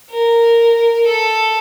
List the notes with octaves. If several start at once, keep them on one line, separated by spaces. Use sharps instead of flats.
A#4
A4